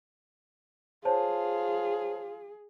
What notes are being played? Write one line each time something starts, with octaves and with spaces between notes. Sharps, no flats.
F4 G#4 C5 C#5 A5